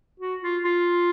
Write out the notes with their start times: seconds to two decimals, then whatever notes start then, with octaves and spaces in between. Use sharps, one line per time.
0.20 F#4
0.42 F4
0.64 F4